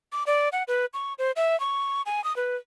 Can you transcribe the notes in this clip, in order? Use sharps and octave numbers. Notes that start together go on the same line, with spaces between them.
D6
D5
F#5
B4
C#6
C5
E5
C#6
G#5
D#6
B4